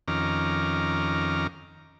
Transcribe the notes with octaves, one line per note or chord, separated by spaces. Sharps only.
F2 D#3 C#4 A#5 D6 F6